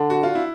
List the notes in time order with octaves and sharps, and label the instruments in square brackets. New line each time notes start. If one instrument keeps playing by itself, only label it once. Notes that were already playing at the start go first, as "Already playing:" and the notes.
Already playing: [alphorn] D3 [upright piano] D4
[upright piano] F#4
F4
E4